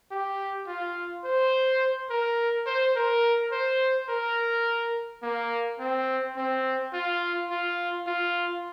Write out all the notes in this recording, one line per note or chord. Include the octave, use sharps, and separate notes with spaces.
G4
F4
C5
A#4
C5
A#4
C5
A#4
A#3
C4
C4
F4
F4
F4